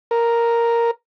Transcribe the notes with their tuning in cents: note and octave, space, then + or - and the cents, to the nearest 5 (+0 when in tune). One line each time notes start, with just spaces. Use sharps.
A#4 +0